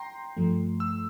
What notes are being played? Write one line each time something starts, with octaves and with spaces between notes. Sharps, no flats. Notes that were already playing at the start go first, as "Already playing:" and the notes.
Already playing: G5 A#5 C6
G2 F3 A3
E6